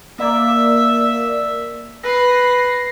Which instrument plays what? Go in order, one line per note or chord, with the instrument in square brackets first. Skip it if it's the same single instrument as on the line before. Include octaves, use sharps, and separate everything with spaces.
[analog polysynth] A#3 D5 [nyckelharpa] E5
[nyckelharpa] B4 [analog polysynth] A#6 C7